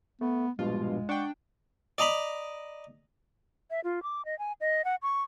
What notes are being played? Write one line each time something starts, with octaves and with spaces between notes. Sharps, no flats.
A3 B3
A#1 G2 B2 G#3 F4
D4 F#5 G5 C#6 D6
D5 D#5 A#5 B5
E5
F4
D6
D#5
G#5
D#5
F#5
C#6